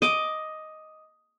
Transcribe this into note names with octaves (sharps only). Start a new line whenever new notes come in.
D#5 D6